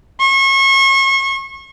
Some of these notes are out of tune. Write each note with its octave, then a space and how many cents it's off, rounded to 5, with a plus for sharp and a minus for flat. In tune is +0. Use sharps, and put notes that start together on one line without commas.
C#6 -35